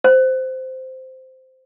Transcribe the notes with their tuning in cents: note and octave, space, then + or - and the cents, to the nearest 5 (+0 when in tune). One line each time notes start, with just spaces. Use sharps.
C5 -10